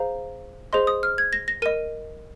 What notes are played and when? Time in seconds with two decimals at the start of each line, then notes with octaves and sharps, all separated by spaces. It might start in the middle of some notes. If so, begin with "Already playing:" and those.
Already playing: G#4 C5 F5 A#5
0.73 G#4 C5 D#5 C6
0.87 D#6
1.03 F6
1.18 G#6
1.33 A#6
1.48 A#6
1.62 A#4 D#5 D#7